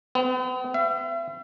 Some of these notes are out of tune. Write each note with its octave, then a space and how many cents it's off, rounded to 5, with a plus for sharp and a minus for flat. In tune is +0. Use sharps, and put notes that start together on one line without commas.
B3 +45
E5 +40